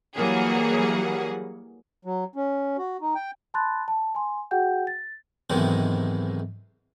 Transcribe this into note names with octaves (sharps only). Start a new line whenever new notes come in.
E3 F#3 G3 A#3 G#4 F#5
F#3
C#4
F#4
D#4
G5
A5 B5 C6 F#6 A6
A5
G#5 C6
F#4 G#4 F#5 G5 G6
A6
B1 G#2 C3 D#3 E3 G#3